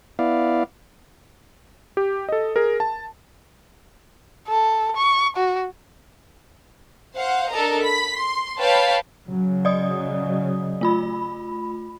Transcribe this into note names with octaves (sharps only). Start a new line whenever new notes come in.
B3 E4 D5 F5
G4
A4 D#5
G#4 A#4
A5
A4
C#6
F#4
C5 F5 F#5
D4 A4 A#4 D#5 A#5
B5 B6
C6
B4 C#5 F5 G5 A5 B5
C#3 F#3
D5 D#5 D#6
A3 F4 B5